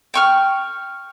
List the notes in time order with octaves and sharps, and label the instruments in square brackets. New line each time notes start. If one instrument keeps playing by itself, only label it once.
[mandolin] G5 C#6 F6